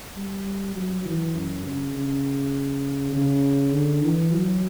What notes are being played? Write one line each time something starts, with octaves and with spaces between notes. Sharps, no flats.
G3
F#3
E3
F#2
C#3
C#3
C#3
D3
E3
F#3